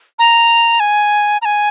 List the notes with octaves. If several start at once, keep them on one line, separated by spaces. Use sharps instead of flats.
A#5
G#5
A#5
G#5